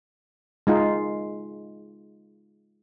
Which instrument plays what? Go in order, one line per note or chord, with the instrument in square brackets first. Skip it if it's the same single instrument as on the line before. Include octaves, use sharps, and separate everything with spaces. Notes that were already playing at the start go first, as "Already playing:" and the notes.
[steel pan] G#3 D#4 F4